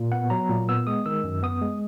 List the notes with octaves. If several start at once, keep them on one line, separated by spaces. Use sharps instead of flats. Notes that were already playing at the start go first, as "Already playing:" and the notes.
Already playing: A#2
B3 F#5
F#3 A#5
A#2
B3 E6
G#3 D#6
D#3 E6
F#2
B3 D#6
G#3